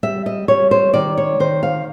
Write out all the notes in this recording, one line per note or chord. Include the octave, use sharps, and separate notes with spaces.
G3 E5
D#5
G3 C#5
C5
D#3 D5
C#5
D#3 C5
F5